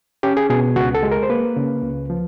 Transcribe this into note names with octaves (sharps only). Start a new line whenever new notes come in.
C#4 G4
G#4
B2 G#4
C#2 F#4
A4
G#3
A#4
C5
A#3 B4
C#3
C#2
F3